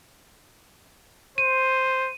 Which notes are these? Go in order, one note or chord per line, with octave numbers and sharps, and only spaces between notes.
C5 D#7